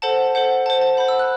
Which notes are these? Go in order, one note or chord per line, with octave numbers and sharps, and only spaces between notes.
A4 C5 F#5 A5
A4 C5 F#5
C5 F#5 A5
A5
C5 F#5 B5
E6
F#6